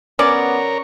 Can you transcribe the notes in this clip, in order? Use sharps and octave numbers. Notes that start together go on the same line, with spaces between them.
B3 C#4 A#4 C#5 D5 D6